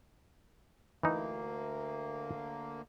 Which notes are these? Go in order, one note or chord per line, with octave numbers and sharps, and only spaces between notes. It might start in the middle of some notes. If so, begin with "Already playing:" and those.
D2 E3 A#3 D#4